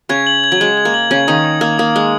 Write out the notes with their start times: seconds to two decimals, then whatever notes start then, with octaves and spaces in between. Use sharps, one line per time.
0.09 C#3 C#4 G#6
0.27 F#7
0.44 G#6
0.52 F#3
0.61 G#3 G#6
0.77 G#6
0.85 A#3
0.94 F#7
1.11 C#3 C#4 G#6
1.28 D#3 D#4 D#6
1.45 G#6
1.61 A#3 G#6
1.78 A#3 D#6
1.96 G#3 D#6